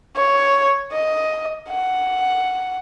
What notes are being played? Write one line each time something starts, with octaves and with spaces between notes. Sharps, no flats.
C#5
D#5
F#5